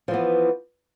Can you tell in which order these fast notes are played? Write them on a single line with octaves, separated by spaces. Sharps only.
F3 E3 B3